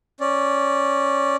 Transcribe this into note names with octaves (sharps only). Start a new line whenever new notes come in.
C#4 D5